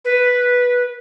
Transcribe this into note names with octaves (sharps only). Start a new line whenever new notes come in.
B4